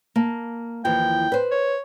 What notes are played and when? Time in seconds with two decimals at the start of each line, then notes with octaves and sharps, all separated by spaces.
0.16 A#3 A5
0.85 D#2 E3 F3 G5
1.32 B4 C5
1.52 C#5